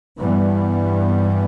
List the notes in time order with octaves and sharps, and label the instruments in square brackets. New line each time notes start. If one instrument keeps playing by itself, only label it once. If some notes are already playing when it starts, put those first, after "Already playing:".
[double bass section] G2 E3 G3 B3